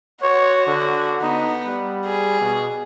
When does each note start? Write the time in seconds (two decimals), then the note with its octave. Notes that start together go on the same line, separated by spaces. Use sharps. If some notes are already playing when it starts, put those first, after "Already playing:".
0.22 F#4 C#5
0.67 D3
1.21 B3 D#4
1.66 G3
2.05 G#4
2.41 B2